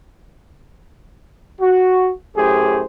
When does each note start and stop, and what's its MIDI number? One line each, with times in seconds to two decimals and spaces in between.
1.61 2.11 66
2.37 2.83 42
2.37 2.83 45
2.37 2.83 67
2.37 2.83 68
2.37 2.83 72